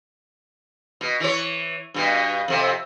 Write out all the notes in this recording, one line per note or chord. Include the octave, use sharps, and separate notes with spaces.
B2
E3 C#5
G2 B2
F2 C3